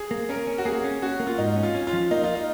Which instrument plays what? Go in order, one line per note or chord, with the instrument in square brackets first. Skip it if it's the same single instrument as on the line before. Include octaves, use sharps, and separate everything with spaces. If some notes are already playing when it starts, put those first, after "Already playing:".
Already playing: [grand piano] G#4
[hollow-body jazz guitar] A#3
[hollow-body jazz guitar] C#4 [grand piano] A#4
[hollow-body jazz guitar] C#4
[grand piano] F#4
[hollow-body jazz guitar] A#3 [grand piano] G#4
[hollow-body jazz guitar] C#4
[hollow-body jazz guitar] C#4 [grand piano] F#4
[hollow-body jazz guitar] A#3
[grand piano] F4
[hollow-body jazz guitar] G#2 [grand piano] D#4
[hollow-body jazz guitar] C#4
[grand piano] F4
[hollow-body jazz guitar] C#4
[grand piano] F4
[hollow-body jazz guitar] F3
[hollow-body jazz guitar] A#3 [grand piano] D#4
[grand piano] F4
D#4